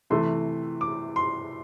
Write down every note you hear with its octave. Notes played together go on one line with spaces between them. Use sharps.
C3 E3 A3 C6
D6
C6